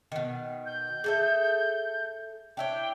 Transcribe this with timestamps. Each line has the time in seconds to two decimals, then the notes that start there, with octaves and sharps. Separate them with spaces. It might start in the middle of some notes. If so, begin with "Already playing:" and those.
0.12 B2 D#3
0.66 G6
1.04 G#4 A4 E5
2.57 D4 E4 C#5 G5